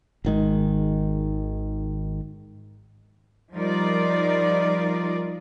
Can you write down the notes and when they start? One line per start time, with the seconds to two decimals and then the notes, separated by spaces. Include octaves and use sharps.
0.25 G#1 D#3 G#3
3.53 F3 G3 D#4 F4 A#4 D5